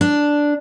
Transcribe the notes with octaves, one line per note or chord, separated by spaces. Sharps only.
D4